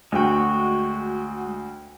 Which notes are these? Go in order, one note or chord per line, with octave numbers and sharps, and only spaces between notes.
D2 G#3 F#4 G5